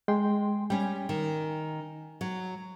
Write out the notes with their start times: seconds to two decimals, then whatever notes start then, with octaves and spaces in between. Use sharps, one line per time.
0.08 G#3 G5 C6
0.70 G3 C#4 G5 G#5
1.09 D#3
2.21 F#3